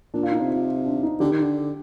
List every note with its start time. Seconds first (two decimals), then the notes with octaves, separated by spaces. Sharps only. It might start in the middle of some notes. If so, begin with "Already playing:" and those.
0.14 A#2 D4
0.23 F4
0.32 D#4
0.41 C3
0.50 F4
0.86 D4
1.03 D#4
1.20 D3 G4
1.31 D#3
1.41 D3